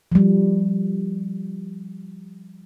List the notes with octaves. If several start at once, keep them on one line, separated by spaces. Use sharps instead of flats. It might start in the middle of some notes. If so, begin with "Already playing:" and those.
F3 G3